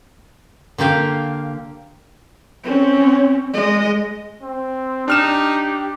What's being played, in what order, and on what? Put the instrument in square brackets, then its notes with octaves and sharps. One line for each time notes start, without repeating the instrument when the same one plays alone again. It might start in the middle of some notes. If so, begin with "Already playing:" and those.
[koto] D3 A#3 G4 F5
[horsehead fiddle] C4 C#4
G#3 D#5
[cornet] C4
[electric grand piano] D4 F6 E7 [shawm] D#4 [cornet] G4